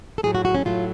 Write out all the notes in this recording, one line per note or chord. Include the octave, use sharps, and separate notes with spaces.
A4
A2 F#3 A3 G#4
F#4
F#4
C#4
A2 F#3 A3 F4